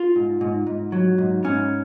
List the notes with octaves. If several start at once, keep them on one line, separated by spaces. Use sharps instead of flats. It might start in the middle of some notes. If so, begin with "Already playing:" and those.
Already playing: F4
G#2
G#2
G#2
F#3
G#2
G#2 C#4